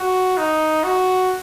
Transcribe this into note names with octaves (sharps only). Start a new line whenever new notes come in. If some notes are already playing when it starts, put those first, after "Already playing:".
Already playing: F#4
D#4
F#4